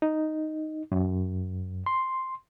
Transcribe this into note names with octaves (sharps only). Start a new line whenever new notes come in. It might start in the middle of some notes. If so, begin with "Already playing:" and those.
D#4
F#2
C6